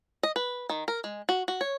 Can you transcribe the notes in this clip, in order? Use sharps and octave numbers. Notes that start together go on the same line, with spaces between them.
D#5
B4
D#3
A#4
G#3
F#4
F#4
C#5